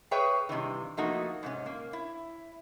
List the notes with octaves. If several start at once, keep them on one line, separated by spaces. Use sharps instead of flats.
G#4 B4 C#5 E5 G5
G2 C3 D#3 E3
F3 A3 A#3 D#4 F#4
G#2 C3 C#4
A#3
E4